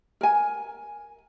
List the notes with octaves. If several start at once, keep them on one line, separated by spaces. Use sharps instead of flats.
A#4 G#5